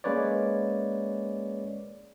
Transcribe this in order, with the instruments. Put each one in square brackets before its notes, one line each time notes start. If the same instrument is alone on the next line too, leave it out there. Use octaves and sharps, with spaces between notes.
[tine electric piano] G#3 A#3 C#4 B4 C#5 D5